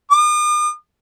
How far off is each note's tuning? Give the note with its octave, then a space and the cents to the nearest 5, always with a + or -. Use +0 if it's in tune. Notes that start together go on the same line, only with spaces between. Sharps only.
D#6 -45